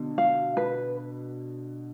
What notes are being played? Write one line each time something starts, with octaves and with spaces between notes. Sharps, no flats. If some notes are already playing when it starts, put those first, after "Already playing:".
Already playing: B2 D3
F5
B4